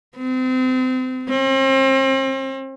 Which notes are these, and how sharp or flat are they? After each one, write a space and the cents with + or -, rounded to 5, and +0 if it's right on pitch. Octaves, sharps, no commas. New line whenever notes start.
C4 -30
C4 +40